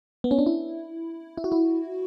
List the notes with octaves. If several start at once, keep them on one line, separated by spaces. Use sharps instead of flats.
B3
C#4
D4
E4
E4
F#4
E4